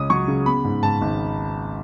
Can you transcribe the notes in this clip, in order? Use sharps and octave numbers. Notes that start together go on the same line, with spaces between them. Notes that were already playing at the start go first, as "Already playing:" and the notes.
Already playing: C#2 C#4 D#6
F#3 C#6
C#3
B3 B5
G#2
G#2 A5
G#1